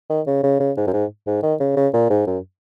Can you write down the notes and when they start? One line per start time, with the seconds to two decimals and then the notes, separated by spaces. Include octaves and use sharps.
0.10 D#3
0.27 C#3
0.43 C#3
0.60 C#3
0.77 G#2
0.87 F#2
0.93 G#2
1.27 G#2
1.43 D#3
1.60 C#3
1.77 C#3
1.94 A#2
2.10 G#2
2.27 F#2